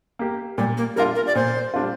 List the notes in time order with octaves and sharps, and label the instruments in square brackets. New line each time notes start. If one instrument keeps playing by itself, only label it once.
[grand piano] A#3 G4
[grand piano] A#2 [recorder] G3
[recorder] A#3
[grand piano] G3 D4 F4 [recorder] A#4
[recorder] A#4
D5
[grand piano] A#2 [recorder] C5
[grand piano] G3 D4 F4